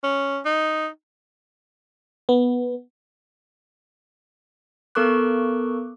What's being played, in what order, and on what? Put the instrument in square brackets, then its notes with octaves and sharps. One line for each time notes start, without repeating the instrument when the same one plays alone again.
[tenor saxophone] C#4
D#4
[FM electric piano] B3
[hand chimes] B3 A4 A#4 C#6 D6 F#6